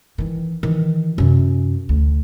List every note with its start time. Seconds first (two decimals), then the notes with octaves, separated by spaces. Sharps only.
0.18 D#3 E3
0.63 D#3 E3
1.18 F#2 C3
1.89 D2